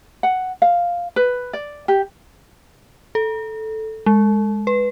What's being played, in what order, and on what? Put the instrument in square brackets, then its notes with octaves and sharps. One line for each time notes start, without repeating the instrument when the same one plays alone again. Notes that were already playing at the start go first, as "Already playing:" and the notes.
[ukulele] F#5
F5
B4
D5
G4
[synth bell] A4
G#3
B4